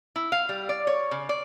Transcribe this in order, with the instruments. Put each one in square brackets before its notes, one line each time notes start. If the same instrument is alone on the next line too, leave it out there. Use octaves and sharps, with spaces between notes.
[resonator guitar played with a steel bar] E4
F5
G3
D5
C#5
C#3
D5